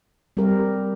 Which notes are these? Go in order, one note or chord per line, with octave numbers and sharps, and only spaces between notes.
G3 C4 G4 A#4